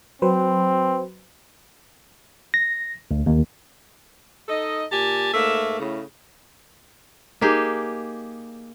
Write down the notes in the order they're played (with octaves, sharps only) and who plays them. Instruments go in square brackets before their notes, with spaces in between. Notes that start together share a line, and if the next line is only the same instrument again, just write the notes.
[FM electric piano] F#3 B4 C5 [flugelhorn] C4
[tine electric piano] A#6
D2
D#2
[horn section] D#4 A4 D#5
A#2 G4 G#5 A5
G#2 A3 A#3 E5
A2 C#3
[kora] A#3 D#4 G4 G#4